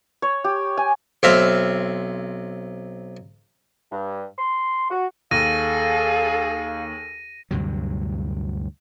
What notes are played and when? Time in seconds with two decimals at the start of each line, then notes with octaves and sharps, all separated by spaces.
0.22 C#5
0.44 G4
0.77 G#5
1.23 B1 C4 E5 F5
3.91 G2
4.37 C6
4.90 F#4
5.31 D#2 G#4 A4 F5 A#6 D#7
7.51 D2 G2 C3 F#3